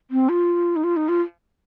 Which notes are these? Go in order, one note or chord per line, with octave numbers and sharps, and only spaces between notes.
C4
F4
D#4
F4
D#4
F4